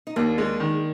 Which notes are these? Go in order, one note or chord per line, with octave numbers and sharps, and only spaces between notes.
D#4
D#2 A#3 D4
G#3
D#3